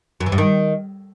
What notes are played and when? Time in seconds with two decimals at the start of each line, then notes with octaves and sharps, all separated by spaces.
0.20 F#2
0.26 E3
0.32 G2
0.38 D#3